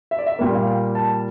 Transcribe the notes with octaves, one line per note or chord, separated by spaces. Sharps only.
E5
D5
E5
A#2 G3 A#3
F5
G5
A5